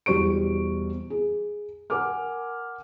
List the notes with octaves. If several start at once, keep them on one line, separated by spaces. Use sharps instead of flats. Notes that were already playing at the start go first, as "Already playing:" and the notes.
E2 B2 G3 C5 C#6 D7
G#4
A#4 F#5 G#5 D6 F6